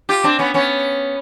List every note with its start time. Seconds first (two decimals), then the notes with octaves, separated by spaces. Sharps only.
0.09 F4 G4
0.24 C4 D4
0.39 B3 C#4
0.54 B3 C#4